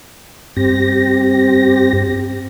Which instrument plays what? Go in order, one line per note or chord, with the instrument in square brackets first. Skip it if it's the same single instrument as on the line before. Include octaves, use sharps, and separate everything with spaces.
[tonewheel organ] G2 C4 G4 A#6